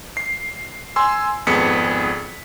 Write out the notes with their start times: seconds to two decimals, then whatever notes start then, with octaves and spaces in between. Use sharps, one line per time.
0.17 C7
0.96 G#5 C6 E6
1.47 G#1 F2 B3 G#4 B6 C#7